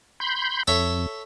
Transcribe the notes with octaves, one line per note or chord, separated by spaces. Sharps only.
B5 C6 G6
F2 A4 C#5 E5